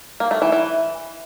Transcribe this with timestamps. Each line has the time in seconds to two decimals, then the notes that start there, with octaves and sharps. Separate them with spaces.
0.20 A#3
0.31 A3
0.42 E3
0.52 E3